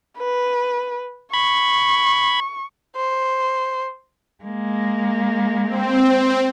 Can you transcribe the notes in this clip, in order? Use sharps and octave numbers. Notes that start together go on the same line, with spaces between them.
B4
B5 C#6 G#6
C5
G#3 A#3
C4